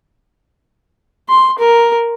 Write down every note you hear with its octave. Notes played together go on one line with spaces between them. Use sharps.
C6
A#4